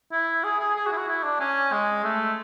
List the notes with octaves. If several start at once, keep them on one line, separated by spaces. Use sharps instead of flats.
E4
G#4
G#4
G#4
F#4
E4
F#4
E4
D4
C#4
G#3
A3